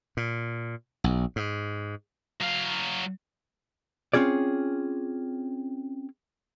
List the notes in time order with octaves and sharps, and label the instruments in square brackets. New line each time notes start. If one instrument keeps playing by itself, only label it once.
[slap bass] A#2
B1
G#2
[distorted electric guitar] F#3 F5
[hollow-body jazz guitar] C4 C#4 F4 G#4 D5